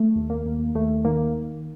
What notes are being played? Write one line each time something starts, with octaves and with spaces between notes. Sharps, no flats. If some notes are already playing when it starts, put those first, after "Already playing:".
Already playing: A3
D#2
A#3
D#2
D#2 A3
D#3 A#3